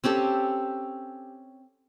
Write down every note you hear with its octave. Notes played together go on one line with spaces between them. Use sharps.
C4 C#4 G4 A4